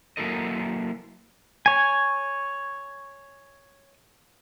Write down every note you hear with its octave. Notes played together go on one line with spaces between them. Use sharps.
F#3 A#3 E4 A4 A#4 D#5
C#5 G#5